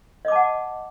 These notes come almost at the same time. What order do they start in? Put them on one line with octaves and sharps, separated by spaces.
D#5 D6 A5 F#5